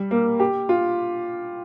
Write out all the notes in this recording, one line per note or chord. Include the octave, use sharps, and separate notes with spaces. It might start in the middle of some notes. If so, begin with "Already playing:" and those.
Already playing: G3
A#3
G4
F4